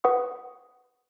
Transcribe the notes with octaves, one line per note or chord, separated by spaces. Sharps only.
B4 F#5 C#6 D#6